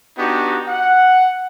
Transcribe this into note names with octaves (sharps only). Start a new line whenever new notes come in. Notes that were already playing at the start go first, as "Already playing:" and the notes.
B3 D4 D#4 F#4 G4
F#5